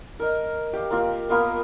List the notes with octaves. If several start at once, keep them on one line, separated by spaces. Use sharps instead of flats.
A#4 D#5
G4 F5
A#3 C4 F4
A#3 B3 F4 A#4